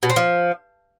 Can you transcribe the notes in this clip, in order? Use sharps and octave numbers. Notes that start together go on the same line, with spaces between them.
B2
C4
F3